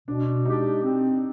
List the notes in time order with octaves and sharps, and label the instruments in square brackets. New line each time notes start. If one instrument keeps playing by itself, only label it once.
[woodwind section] B2 [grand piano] D4
[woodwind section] G#3 D4 G4 D5 [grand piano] D#4
[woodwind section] C4